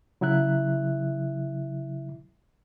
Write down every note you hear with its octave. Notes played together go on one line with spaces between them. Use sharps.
C#3 F#3 E4 E5 F#6